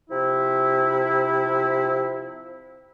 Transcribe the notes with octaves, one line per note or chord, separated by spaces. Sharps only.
C3 F3 E4